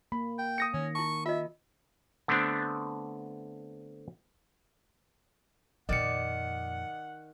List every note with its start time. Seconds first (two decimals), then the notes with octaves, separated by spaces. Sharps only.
0.12 A#3 B5
0.39 G5
0.58 D#6 A#6 C#7
0.74 D#3 C#4
0.95 E4 A5 C#6
1.26 F4 D#5 E5
2.28 D3 A3 B3 C4 D4
5.89 F2 A#2 D#3 D5 D#5 F#5 C#7